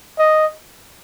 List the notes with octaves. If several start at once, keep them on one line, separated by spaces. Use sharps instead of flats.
D#5